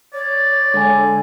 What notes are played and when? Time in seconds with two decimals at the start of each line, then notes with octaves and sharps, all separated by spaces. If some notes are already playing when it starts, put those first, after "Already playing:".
0.14 C#5 D5
0.74 D3 G#3 G#5